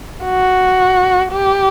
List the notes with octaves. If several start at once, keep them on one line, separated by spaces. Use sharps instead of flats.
F#4
G4